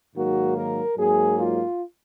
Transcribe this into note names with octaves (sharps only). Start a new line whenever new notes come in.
G#2 D#3 F#3 A#3 F#4
A#4
G#2 F#3 A#3 G#4
F4